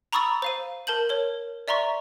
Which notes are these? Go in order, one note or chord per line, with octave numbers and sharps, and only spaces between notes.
A#5 B5 C#6 D#6 E6 A6
C5 F5 D#7
A#4 A5 G6 F#7
A#4 C#5
D5 E5 A#5 C6 C#6